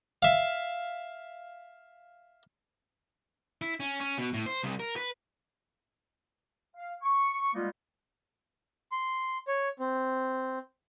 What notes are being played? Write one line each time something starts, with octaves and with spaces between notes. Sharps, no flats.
E5 F5
E4
C#4
C#4
B2
A2
C5
C2
A#4
B4
F5
C#6
G3 G#3 A#3 B3 D#4 F4
C6
C#5
C4